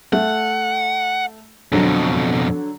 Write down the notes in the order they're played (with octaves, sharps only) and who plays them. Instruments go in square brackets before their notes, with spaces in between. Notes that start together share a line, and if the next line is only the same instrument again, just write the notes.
[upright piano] A3 [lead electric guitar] F#5
[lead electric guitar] F2 B2 [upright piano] D3 F#3